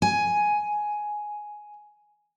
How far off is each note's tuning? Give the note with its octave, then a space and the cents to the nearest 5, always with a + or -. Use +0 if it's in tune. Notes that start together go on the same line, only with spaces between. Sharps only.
G#5 +10